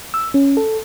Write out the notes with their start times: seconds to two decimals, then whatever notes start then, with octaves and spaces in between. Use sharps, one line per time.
0.14 E6
0.34 C#4
0.57 A4